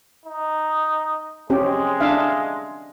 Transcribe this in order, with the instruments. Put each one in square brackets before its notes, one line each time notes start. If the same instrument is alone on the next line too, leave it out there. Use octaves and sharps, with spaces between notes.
[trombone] D#4
[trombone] G#3 [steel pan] C4 C#4 G4
[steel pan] D4 E5 F5